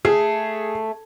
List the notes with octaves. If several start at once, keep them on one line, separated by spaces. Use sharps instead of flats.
A3 G#4